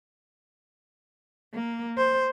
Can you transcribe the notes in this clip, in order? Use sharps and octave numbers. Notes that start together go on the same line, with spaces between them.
A#3
C5